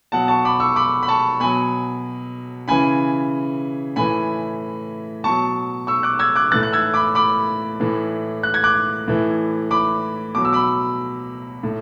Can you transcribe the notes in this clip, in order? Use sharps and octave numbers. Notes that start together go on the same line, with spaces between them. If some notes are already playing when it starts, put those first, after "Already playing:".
B2 F#3 F#5 A5
A5 C#6
B5 D6
C#6 E6
B5 D6
B5
A5 C#6
B2 F#3 G#5 B5
C#3 E3 G#5 B5
A2 E3 G#5 B5
B2 F#3 A5 C#6
C#6 E6
D6 F#6
E6 G#6
D6 F#6
A2 E3 F#6 A6
F#6
E6 G#6
B5 D6
B5 D6
A2 E3
F#6
G#6
D6 F#6
A2 E3
B5 D6
B2 F#3 D6
E6
B5 D6
A2